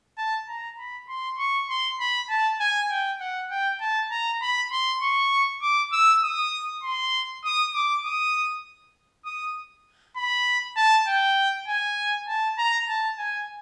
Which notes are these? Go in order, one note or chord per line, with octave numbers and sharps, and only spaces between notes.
A5
A#5
B5
C6
C#6
C6
B5
A5
G#5
G5
F#5
G5
A5
A#5
B5
C6
C#6
D6
E6
D#6
C6
D#6
D6
D#6
D#6
B5
A5
G5
G#5
A5
A#5
A5
G#5